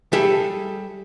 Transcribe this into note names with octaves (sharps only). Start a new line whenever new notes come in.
G3 G#4 A4 E5